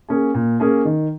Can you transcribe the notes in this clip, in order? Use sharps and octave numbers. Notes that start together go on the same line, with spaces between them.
A#3 C#4 G#4
A#2
A#3 C#4 G#4
D#3